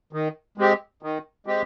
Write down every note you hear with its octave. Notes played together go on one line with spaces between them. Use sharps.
D#3
G#3 C4 G4
D#3
G#3 C4 G4